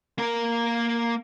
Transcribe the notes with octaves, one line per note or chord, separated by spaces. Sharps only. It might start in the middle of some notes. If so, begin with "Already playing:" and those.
A#3 A#4